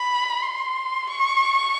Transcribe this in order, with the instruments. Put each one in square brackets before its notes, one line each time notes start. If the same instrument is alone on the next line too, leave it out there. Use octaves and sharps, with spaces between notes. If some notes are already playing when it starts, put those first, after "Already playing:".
Already playing: [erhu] B5
C6
C#6